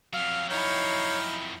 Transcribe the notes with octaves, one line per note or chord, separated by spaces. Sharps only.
F2 F#3 F5
D#4 E4 C#5 F5 G5 A#5